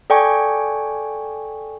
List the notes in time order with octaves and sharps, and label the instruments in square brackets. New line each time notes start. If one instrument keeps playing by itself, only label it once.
[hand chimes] A4 D5 G5 G#5 C#6